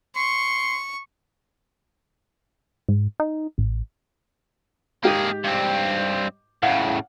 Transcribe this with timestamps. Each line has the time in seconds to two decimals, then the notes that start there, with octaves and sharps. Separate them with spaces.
0.16 C6 C#6
2.89 G#2
3.20 D#4
3.58 A1
5.04 G#2 A#3 G4 G#4
5.45 G2 C4
6.63 A2 C#3 F5 F#5